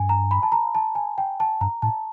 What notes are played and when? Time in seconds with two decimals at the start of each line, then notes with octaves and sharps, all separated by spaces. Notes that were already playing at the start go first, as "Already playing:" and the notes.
Already playing: G2 G#5
0.09 A#5
0.31 B5
0.43 A5
0.52 A#5
0.75 A5
0.95 G#5
1.18 G5
1.40 A5
1.61 G2 A#5
1.82 A2 A5